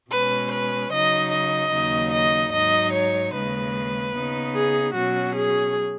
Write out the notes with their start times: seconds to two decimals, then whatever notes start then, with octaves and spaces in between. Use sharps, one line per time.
0.10 B2 G#3 C#4 B4
0.50 B4
0.91 C#3 F#3 D#4 D#5
1.31 D#5
1.72 D#2 C#3 F#3 D#4
2.11 D#5
2.52 G#2 F#3 D#4 D#5
2.92 C#5
3.33 D#2 C#3 G#3 B4
4.14 C#3 B3 D#4
4.54 G#4
4.94 B2 F#3 C#4 F#4
5.35 G#4